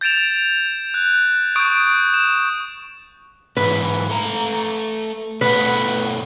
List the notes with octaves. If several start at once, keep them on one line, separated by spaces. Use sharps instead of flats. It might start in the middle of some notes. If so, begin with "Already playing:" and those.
G6 A6 D7 E7 F7
F#6
C#6 D#6 G6 D7
E7
G#2 E3 B4
A3 A#5
B2 A3 B4 F#5